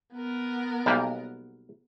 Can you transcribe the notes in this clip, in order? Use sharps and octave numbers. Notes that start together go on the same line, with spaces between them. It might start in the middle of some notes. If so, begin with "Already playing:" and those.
B3 A#4
B1 G3 A#3